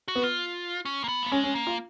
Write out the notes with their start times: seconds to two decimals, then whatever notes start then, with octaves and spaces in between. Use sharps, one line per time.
0.08 F#4
0.15 B3
0.24 F4
0.85 C#4
1.04 A#3
1.08 B3
1.23 A#3
1.32 G#3 C#4
1.44 C#4
1.55 A#3
1.67 F4